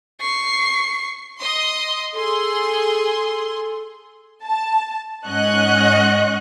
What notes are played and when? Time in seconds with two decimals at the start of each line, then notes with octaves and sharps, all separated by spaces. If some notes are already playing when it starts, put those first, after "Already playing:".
0.21 C#6 C7
1.40 D#5 C6 D#6
2.14 G#4 A4 C6
4.43 A5
5.27 G#2 C#4 D#5 F#5 C#6 F#6